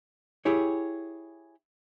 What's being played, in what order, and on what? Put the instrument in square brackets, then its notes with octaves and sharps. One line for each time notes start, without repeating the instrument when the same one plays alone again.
[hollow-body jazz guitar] E4 G4 G#4 C#5